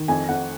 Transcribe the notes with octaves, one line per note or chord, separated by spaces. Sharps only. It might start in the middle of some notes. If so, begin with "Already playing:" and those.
Already playing: D#3
F2 G#5
F2 F#5